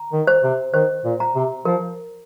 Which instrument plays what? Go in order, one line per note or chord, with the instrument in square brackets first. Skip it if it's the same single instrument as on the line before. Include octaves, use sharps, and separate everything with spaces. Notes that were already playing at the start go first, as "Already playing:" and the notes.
Already playing: [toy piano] A#5
[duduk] D#3
[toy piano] C5
[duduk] C3
[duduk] D#3 [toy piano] C5
[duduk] A#2
[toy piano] A#5
[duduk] C3
[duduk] F3 [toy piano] A#4